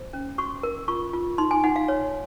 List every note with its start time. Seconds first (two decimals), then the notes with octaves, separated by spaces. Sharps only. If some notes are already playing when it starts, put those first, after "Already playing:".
Already playing: C5
0.13 C#4
0.38 F#4 C#6
0.63 A#4
0.88 F4 C#6
1.13 F4
1.38 D#4 C6
1.51 G#5
1.64 D#4 F#5
1.76 F5
1.88 C#5